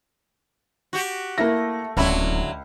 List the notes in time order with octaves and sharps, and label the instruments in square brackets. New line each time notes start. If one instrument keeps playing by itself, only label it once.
[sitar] F#4 G4
[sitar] A3 [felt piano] A#3 E4 A#6
[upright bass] D1 [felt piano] C#2 [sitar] D3 F#3 E4